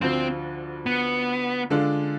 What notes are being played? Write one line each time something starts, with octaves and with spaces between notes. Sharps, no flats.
D2 D3 F3 C4
B3
D3 G#3 D4 F4 A4